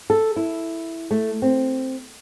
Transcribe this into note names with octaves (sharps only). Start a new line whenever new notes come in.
A4
E4
A3
C4